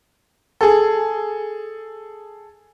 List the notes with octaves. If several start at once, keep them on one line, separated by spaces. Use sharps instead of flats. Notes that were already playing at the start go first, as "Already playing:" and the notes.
G#4 A4